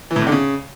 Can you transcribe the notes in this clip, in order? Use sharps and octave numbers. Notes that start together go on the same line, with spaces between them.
E3
A2
C3
D3
C#3